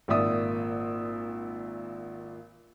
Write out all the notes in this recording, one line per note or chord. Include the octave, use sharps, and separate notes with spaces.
G#1 A#2 D5 E5 D#6